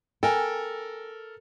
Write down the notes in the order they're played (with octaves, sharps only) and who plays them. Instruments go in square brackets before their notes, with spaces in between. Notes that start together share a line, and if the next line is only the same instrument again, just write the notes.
[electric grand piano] A4 A#4 [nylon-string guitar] G5 G#5